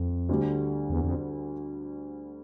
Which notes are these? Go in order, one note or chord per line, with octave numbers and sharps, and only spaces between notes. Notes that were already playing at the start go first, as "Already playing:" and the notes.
Already playing: F2
D2 D3 G3
E2
F2